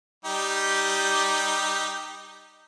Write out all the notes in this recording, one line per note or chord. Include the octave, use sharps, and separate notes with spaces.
G3 D#4 G4